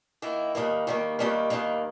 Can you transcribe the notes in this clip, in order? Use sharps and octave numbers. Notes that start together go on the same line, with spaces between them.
D#3 A#3 E4
D#2 D#3 G3 A#3
D#2 D#3 G3 A#3
D#2 D#3 G3 A#3
D#2 D#3 G3 A#3